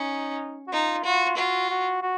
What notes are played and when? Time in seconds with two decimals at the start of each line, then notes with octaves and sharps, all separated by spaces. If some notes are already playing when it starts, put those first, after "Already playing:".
Already playing: C#4 D#4
0.68 F#4
0.72 D#4 F4
1.05 F4 F#4
1.37 F4 F#4
1.70 F#4
2.02 F#4